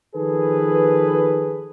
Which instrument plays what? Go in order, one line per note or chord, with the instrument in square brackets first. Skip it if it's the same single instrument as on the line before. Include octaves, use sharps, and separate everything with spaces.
[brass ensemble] D#3 F3 G#4 A4 B4